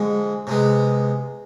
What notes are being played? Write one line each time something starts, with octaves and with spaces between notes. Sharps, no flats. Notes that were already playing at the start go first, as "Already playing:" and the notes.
Already playing: F2 D3 G#3
C3 G#3 B3